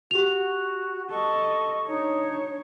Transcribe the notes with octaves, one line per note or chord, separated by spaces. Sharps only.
F#4 G4 F7
A4 D#5 C#6
D4 D#4 C#5